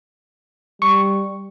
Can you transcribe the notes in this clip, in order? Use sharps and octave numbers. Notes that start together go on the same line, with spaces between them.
G3 C#6